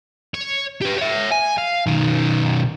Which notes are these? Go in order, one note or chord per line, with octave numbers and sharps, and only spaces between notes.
C#5
G4 B4
C#5 E5
G#5
F5
B1 D#3